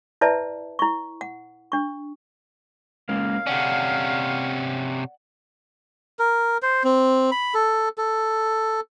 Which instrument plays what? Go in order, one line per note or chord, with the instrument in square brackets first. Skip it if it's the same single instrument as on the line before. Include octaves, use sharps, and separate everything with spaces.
[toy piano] E4 B4 D5 E5 A5
E4 C#6
F#5
D4 C#6
[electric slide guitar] G#3 A#3 C#4 [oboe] F5
[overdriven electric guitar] C3 C#4 [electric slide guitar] D5 F#5
[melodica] A#4
C5
C4
B5
A4
A4